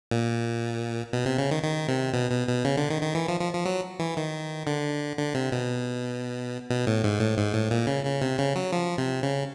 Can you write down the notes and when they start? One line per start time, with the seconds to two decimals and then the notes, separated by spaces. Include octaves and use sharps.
0.11 A#2
1.13 B2
1.26 C3
1.38 C#3
1.51 D#3
1.63 D#3
1.88 C3
2.14 B2
2.31 B2
2.48 B2
2.64 C#3
2.77 D3
2.90 D#3
3.02 D#3
3.15 E3
3.28 F3
3.40 F3
3.53 F3
3.65 F#3
3.99 E3
4.17 D#3
4.67 D3
5.18 D3
5.35 C3
5.52 B2
6.70 B2
6.87 A2
7.04 G#2
7.20 A2
7.37 G#2
7.54 A2
7.71 A#2
7.87 C#3
8.05 C#3
8.22 C3
8.38 C#3
8.56 F#3
8.72 F3
8.98 C3
9.23 C#3